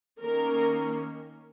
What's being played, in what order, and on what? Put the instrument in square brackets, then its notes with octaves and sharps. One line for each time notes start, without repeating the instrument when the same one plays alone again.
[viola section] D#3 A#3 C#4 A#4